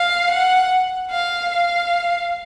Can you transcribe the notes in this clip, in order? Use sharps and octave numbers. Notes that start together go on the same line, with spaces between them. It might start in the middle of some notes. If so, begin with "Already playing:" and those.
Already playing: F5
F#5
F5
F5